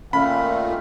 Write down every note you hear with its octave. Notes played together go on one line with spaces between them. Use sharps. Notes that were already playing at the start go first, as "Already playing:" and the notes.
A#2 D#3 A3 C#4 F5 B5